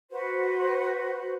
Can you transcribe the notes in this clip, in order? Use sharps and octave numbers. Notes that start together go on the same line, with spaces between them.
F#4 B4 C5